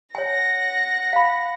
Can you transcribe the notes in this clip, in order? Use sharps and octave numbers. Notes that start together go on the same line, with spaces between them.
C#5 F#5 G#5 A#6
F5 B5